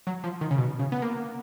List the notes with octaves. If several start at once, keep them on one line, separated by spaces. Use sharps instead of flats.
F#3
F3
D#3
C#3
B2
C#3
B3
A#3